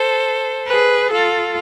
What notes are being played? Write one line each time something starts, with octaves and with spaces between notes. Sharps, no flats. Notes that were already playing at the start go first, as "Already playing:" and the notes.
Already playing: A4 C5
G#4 B4
F4 A4